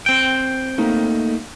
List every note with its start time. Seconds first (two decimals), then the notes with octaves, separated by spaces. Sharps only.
0.06 C4 G5
0.78 A3 A#3 D#4